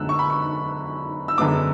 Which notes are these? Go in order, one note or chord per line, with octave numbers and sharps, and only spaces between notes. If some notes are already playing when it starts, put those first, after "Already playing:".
Already playing: F#2 D3 G#3 B3 E6 F#6
C#6
B5
C#6
E6
F#2 D3 G#3 B3 D6